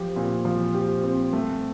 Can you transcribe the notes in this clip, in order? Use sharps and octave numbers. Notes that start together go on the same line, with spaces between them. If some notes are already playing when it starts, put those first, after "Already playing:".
Already playing: F3 G4
A#2
F3
G4
C4
A3